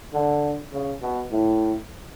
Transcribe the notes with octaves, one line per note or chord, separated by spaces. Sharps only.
D3
C#3
B2
A2